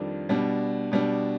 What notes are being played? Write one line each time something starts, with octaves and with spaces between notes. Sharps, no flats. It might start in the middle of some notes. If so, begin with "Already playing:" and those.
Already playing: F2 D#3 G3 D4 F4
B2 G3 D4
B2 G3 D4